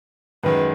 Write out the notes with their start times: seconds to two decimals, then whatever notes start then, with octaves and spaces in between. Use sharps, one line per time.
0.44 F#2 D#3 G#3 B4